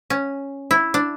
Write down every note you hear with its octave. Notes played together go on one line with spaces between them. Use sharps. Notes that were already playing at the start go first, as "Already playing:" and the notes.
C#4
E4
D4